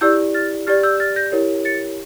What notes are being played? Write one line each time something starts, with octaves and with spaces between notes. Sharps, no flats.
E4 G4 D5 E6 G6
F6 A6
G4 D5 F6 A6
E6 G6
F6 A6
G6 A#6
E4 G4 A#4 C#5
A6 C#7